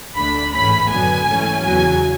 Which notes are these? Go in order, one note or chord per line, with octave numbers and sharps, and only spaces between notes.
D2 D3 A3 D4 B5
A1 G#2 E3 A3 C#4 B5
F#2 D3 F#3 B3 G#5
G#2 E3 A3 C#4
E2 C#3 F#3 G#5